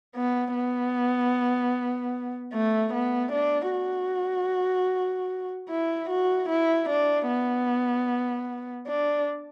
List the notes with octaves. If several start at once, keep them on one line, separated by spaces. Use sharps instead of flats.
B3
B3
A3
B3
D4
F#4
E4
F#4
E4
D4
B3
D4